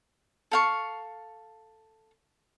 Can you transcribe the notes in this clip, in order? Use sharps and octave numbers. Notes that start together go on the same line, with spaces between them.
A4 F5 C#6